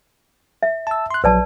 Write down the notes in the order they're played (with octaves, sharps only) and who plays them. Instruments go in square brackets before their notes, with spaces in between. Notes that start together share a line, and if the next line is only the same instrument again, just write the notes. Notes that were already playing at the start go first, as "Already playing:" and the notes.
[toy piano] E5
[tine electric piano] A5 E6
C6 F#6
[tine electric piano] A#1 F#3 [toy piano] B4 D5 A5